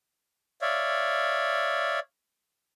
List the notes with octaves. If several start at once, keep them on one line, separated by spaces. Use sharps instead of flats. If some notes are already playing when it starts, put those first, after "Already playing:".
C#5 D5 E5 F5